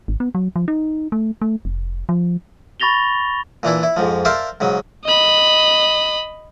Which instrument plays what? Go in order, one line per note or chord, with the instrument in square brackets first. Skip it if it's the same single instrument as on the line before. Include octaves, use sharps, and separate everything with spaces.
[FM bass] G#1
B3
F#3
F3
D#4
A3
A3
F1
F3
[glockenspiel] B5 C#6 A6 A#6 F7 G7
[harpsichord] A#2 E3 D4 E4
E4
F2 G#2 F3
A#4 C5 D5 E5 F5 A5
G#2 C#3 F#3
[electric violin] D#5 B5